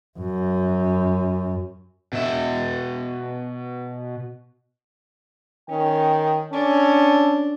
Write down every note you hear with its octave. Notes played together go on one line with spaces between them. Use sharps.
F#2
B2 E5
D#3 C#4 G5
C#4 D4 A4